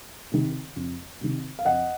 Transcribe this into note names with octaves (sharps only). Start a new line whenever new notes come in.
C3 D#3
F2
C3 D#3
F5
F2 D#5 F#5